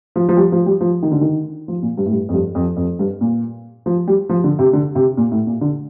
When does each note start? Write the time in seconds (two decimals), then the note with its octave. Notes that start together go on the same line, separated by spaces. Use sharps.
0.16 F3
0.29 F3
0.37 G3
0.52 F3
0.66 G3
0.81 F3
1.03 D#3
1.12 D3
1.21 D#3
1.68 F3
1.82 A#2
1.97 G2
2.06 A2
2.12 G2
2.29 F2
2.33 G2
2.55 F2
2.77 F2
2.99 G2
3.21 A#2
3.86 F3
4.07 G3
4.29 F3
4.44 D3
4.59 C3
4.73 D3
4.95 C3
5.17 A#2
5.31 A2
5.47 A#2
5.61 D3